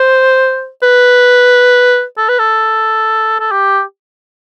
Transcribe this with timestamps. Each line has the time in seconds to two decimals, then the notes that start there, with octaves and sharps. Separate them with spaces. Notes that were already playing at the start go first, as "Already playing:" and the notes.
Already playing: C5
0.83 B4
2.17 A4
2.29 B4
2.39 A4
3.40 A4
3.51 G4